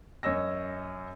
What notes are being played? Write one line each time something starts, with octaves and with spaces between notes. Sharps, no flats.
F#2 C#5 D#5 E6 A#6